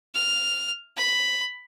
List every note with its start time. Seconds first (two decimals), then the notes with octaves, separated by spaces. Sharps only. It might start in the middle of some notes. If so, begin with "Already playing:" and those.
0.15 F6
0.97 B5